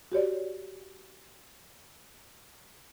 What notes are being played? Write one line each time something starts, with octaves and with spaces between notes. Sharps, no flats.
F#4 G4 C#5 D5